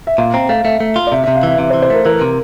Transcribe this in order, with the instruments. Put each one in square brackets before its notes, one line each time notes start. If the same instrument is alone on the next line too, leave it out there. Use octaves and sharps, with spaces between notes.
[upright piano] E5
[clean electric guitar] A#2 [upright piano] F5
[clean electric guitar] C4 [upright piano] A#5
[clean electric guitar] A3 [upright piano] F5
[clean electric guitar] A3 [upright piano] E5
[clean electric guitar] A3
F4
[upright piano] D5
[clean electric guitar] C3 [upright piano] E5
[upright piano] E5
[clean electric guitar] C3
[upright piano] F5
[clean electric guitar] E3 [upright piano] E5
[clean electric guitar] C3 [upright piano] E5
[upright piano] C5
[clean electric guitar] E3
[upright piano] C5
[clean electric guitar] A3 [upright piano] A#4
[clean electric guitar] E3 [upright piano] A#4
[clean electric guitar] C3